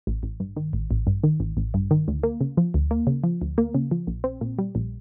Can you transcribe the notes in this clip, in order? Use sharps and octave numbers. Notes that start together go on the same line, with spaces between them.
A1
A1
G2
D#3
A1
A1
G2
D#3
A1
A1
G2
D#3
D2
A#3
C#3
F3
D2
A#3
C#3
F3
D2
A#3
C#3
F3
A#1
C4
A#2
G3
A#1